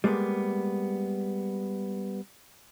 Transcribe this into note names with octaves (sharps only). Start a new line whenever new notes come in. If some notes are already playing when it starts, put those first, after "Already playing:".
G3 G#3 A#3 B3